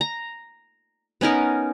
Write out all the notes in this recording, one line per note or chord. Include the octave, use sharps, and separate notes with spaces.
A#5
B3 C#4 D#4 A#4